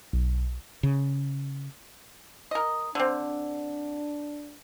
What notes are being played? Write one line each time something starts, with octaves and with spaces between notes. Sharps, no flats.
B1
C#3
A#4 D#5
D3 C4 D4